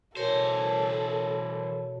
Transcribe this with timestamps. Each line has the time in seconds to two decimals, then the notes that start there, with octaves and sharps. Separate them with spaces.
0.17 B2 E3 A4 A#4 C5 C#5